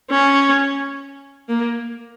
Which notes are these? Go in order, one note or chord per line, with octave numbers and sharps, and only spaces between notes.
C#4
A#3